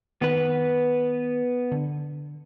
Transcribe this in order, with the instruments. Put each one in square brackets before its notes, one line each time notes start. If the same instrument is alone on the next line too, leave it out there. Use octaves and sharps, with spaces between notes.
[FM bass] D#3 [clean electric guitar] B3 B4
[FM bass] D3